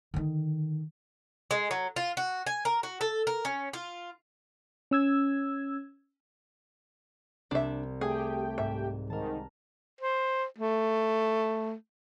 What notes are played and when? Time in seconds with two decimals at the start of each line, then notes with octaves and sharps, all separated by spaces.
0.14 D3 D#3
1.51 G#3
1.71 F#3
1.96 F4
2.17 F#4
2.47 G#5
2.65 A#4
2.83 F#4
3.01 A4
3.27 A#4
3.45 C#4
3.73 F4
4.91 C#4 E6 G#6
7.51 C2 D4 E5
8.01 A3 G4 G#4 G5
8.58 G#2 E5
9.10 G#2 D#3 A#4 A5
10.01 C5
10.58 A3